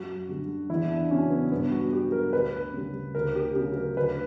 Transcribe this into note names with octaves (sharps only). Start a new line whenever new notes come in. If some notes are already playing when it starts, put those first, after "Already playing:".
Already playing: F#2 F#4
D3 G3
E2 E4
D4
C#3 F#3 C#4
B3
G2 B3
F#4
F#3 G4
A#4
D2 B4
C#3 G3
D2 A#4
G4
C#3 F#3 G4
A#4
D2 B4